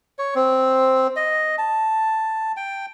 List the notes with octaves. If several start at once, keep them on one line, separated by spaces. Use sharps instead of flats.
C#5
C4
D#5
A5
G5